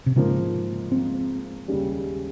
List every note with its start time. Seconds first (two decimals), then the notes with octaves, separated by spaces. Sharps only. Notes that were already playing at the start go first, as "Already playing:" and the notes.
0.06 C3
0.16 G#2 C#3 F3 A#3
0.92 C4
1.68 D#2 C#3 G3